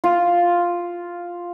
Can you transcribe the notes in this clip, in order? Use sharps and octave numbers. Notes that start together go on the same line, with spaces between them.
F4